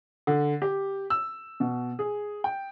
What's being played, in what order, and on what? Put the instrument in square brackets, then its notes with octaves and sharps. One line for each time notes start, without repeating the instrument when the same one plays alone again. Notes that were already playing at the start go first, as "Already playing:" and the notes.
[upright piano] D3
G4
E6
B2
G#4
G5